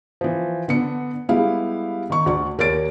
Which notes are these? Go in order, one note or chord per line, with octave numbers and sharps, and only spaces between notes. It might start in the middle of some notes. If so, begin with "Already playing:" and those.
E3 F3
D3 B3 D4 C#7
G3 G#3 B3 E4 G4 F5
D#3 C#6
D2 D5 C#6
D#2 A#4 C#5 D5 A6 D7